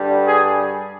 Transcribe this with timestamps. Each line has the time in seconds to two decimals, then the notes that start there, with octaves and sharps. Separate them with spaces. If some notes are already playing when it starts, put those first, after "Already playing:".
Already playing: G2 D3 G3
0.25 G#4